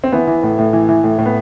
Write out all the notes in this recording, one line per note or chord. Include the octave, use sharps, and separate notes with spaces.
C4
E3 B3
E3
A2
A2
E3
E3
A2
A2
B3